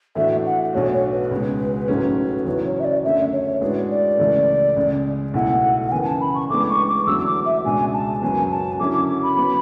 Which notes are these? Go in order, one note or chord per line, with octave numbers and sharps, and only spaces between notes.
A2 E3 A3 D4 F#4 E5
F#5
B1 B2 A3 D4 F#4 C#5
C#5
B4
C#2 B2 G#3
A1 G#2 F#3 A3 C#4
E2 C#3 F#3 C#4 E4 B4
C#5
E5
D5
F#2 D3 A3 E5
C#5
A2 G#3 D4 F#4 B4
D5
C#2 C#3 E3 A3
C#2 C#3 G#3
B1 B2 A3 E4 F#5
F#5
F#1 F#2 C#3 E3 B3 G#5
G#5
A5
B5
C#6
A1 A2 G#3 B3 D4 D6
C#6
D6
E2 D3 F#3 A3 E6
D6
E5
C#2 B2 G#3 D4 F#4 G#5
A5
F#1 F#2 C#3 F#3 B3 G#5
A5
F#2 D3 F#3 C#4 E4 D6
D6
D6
B5
F#3 B3